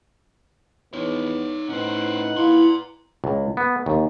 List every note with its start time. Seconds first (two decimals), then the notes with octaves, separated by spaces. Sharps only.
0.93 E2 B3 D#4 C#5
1.69 A2 C#4 D#4 B4 C5 F#5
2.37 D#2 E4 F4 A#5 C6
3.24 C#2
3.57 B3
3.86 D#2